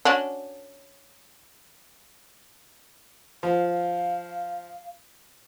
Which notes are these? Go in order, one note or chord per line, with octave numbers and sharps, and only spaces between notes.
C#4 D4 F#4
F3 F5